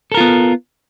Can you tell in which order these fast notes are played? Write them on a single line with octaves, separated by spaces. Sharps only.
A4 A#4 F4 B3